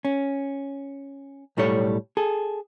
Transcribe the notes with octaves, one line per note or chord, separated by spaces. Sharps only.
C#4
B1 A2 G3 A4 C#5
G#4 A4